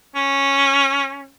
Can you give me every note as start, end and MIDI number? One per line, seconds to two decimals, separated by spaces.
0.16 1.30 61